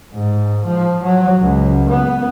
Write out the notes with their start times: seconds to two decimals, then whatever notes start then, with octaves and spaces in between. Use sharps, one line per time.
0.13 G#2
0.66 F3
1.04 F#3
1.41 C#2
1.89 B3